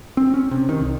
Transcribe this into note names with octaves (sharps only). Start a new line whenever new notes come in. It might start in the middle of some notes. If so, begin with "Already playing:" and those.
C4
C#4
C3
D#3
C2